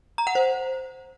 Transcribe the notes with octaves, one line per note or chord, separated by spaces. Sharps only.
A#5
F#5
C5